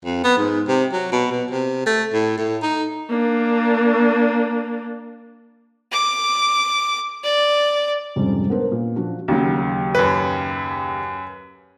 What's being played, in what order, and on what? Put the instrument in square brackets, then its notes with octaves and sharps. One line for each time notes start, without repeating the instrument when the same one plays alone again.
[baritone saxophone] F2
B3
G#2
C3
F#3
B2
B2
C3
A3
A2
A2
D#4
[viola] A#3 D4
[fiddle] D6
D5
[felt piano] F2 G#2 C3 G3 C#4
B3 D4 A#4 C5
A#2
F3 D4 F#4
[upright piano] D#2 C#3 F#3
[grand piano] F#2 B4